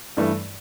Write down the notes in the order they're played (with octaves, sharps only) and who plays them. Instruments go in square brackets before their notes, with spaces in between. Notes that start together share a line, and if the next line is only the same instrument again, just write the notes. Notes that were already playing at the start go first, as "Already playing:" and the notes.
[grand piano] G2 E3 A3